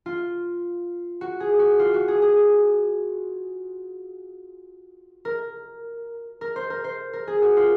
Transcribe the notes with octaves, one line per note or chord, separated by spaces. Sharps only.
F4
F#4
G#4
F#4
F4
F#4
G#4
G#4
A#4
A#4
C5
A#4
C5
A#4
G#4
F#4
F4